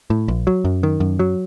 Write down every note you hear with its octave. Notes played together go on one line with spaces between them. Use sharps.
A2
A#1
F#3
F#2
D#3
F#2
F#3